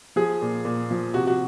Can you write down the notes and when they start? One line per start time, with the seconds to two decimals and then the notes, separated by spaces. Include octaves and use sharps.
0.16 F3 G#4
0.42 A#2
0.65 A#2
0.91 F3
1.14 C3 F#4
1.27 F#4